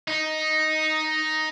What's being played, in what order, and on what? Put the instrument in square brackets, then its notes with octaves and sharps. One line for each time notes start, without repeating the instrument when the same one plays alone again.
[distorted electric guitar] D#4